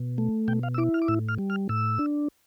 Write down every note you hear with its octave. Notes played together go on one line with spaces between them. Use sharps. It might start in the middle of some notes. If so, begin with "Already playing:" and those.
Already playing: B2
A3
B2 G5
F5
E6
E4 D6
F6
D6
A2 E6
F6
G3
F6
A2 E6
D4